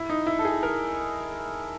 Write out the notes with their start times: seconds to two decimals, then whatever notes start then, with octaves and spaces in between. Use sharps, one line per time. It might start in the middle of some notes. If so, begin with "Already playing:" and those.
Already playing: E4
0.10 D#4
0.27 E4
0.39 A4
0.45 G#4
0.63 A#4